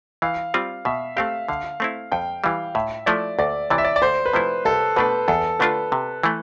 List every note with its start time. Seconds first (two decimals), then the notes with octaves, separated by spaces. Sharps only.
0.22 E3 F5
0.54 G3 C4 F4
0.85 B2 E5
1.16 A3 C4 G4 F5
1.48 D3 F5
1.80 A3 C4 E4
2.12 F2 G5
2.44 E3 G3 F5
2.75 A2 E5
3.06 F3 A3 E4 D5
3.39 D2 D5
3.70 C3 E3 D5
3.78 E5
3.84 D5
3.96 D5
4.02 D2 C5
4.26 B4
4.33 C3 F3 A3 E4 C5
4.65 C2 A4
4.96 B2 A3 D4 B4
5.28 E2 A4
5.59 D3 A3 D4 F4 B4
5.92 C3
6.23 E3 A3